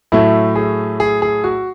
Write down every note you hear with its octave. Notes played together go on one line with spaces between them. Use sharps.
A2 F#3 A3 E4
G#4
G#4
G#4
F#4